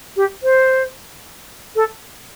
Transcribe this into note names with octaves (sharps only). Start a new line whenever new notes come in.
G4
C5
A4